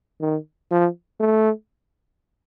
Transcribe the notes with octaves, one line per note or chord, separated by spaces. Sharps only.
D#3
F3
A3